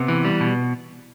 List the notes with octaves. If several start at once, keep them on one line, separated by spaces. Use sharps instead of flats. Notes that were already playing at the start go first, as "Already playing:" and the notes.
Already playing: C3 B3
E3
G3
B2